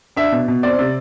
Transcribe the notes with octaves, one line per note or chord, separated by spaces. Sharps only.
D4 E5
B2
B2
C4 D5
C3